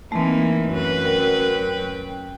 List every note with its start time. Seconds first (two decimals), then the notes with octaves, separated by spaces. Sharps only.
0.12 E3 A3 A#3 C4 D#4
0.69 F#2 B4
1.05 A#4 G5